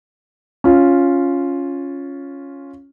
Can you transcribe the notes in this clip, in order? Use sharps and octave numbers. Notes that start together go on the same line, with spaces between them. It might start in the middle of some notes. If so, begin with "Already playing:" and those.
C#4 F4